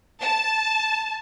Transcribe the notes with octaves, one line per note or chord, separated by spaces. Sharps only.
A5